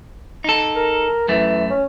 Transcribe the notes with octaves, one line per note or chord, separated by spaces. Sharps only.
D#4 A4
A#4
F#2 E3 A3
C#4